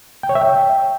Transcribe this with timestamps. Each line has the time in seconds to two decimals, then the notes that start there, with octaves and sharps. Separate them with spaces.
0.23 G5
0.29 C#5
0.35 E5
0.41 G5